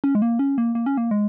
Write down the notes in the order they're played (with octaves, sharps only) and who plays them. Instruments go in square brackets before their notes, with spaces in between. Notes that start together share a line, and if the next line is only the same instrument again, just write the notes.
[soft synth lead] C#4
G#3
A#3
C#4
A#3
A#3
C#4
A#3
G#3